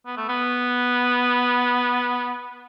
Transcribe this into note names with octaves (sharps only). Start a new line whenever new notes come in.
B3
A3
B3